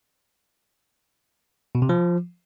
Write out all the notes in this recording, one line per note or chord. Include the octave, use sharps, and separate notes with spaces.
B2
C3
F3